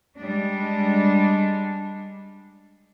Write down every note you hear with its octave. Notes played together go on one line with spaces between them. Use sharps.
G3 G#3 D4